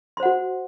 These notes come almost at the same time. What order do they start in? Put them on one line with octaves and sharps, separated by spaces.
C6 C5 F#5 F#4